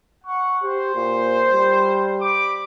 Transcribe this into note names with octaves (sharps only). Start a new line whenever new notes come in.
F#5 C#6
G4 C5
A#2
G3
B5 D6